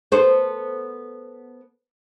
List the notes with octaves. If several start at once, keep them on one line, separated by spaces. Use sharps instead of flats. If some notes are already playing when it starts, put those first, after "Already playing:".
B3 A4 C5